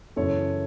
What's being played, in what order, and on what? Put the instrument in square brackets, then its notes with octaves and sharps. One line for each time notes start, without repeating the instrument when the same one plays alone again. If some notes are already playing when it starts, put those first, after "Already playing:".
[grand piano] F#2 C#3 E3 A4 C#5